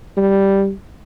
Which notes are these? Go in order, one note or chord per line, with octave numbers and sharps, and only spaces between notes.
G3